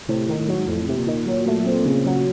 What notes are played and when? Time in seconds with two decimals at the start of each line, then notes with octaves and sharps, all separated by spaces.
0.08 A2 C3
0.28 D#3
0.38 A2
0.48 F#3
0.57 G#2
0.67 F2 A2
0.88 A2 C3
0.97 A#2
1.06 D#3
1.26 F#3
1.46 A3
1.65 C4
1.85 C#3
2.05 F#3